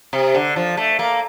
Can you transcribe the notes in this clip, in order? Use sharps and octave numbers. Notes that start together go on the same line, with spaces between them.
C3
D3
F3
A3
A#3